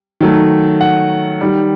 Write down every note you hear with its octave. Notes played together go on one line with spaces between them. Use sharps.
D#3 F#3 A3
F#5
D#3 G3